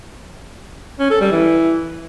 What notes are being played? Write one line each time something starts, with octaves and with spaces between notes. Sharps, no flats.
C#4
A4
G3
E3